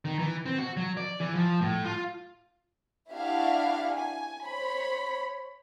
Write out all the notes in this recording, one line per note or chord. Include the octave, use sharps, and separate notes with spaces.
D#3
E3
C4
F#4
F#3
D5
E3
F3
A2
F4
D4 E4 F#4 G4 E5 F5
G#5
C5 C#5 B5